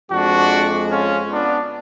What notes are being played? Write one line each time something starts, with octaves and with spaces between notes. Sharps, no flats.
F2 F3 G#3 D4 F#4
C#4 F4
B3 D4